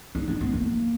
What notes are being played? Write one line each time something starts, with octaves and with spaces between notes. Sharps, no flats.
D#4
D4
B3
A#3